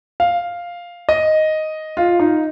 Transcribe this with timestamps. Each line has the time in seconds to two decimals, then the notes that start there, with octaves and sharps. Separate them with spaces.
0.20 F5
1.09 D#5
1.97 F4
2.19 D#4